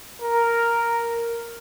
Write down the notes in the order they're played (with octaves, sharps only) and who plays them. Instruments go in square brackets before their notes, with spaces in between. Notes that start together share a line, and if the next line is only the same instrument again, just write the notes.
[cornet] A#4